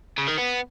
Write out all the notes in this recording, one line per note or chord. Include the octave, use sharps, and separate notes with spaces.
C#3
D#3
B3